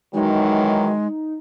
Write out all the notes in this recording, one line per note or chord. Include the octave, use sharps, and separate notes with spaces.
D#3 E3 F#3 G#3 D#4